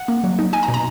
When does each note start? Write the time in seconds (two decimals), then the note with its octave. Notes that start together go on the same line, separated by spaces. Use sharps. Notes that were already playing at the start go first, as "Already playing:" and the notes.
Already playing: F#5
0.08 A#3
0.24 F#3
0.39 D#4
0.53 D#4 G#5
0.63 A#5
0.68 B2
0.74 A#5